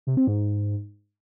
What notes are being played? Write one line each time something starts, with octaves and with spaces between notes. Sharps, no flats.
C3
C4
G#2